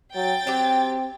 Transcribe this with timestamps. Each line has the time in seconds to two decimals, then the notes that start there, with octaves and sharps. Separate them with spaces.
0.15 F#3 G5 A6
0.47 F#3 C4 G4